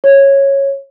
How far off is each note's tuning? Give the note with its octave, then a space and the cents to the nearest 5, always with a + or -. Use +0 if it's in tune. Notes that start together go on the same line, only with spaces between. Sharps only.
C#5 -10